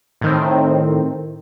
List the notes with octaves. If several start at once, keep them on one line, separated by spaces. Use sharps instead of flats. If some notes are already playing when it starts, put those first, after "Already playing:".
A2 D#3 C4